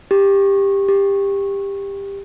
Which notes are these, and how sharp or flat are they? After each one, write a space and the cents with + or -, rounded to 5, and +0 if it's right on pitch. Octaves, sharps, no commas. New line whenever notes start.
G4 +15
G4 +20